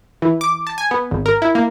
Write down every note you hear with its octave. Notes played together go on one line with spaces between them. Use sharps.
E3
D6
A5
G#5
B3
G#1
A#4
E4
A#3